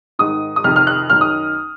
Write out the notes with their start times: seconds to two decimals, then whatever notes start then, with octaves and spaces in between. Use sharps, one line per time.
0.19 G#2 D#3 D#6
0.56 D#6
0.64 F2 C3 D#3 F6
0.76 F6
0.87 F#6
1.10 F#2 D#3 F6
1.21 D#6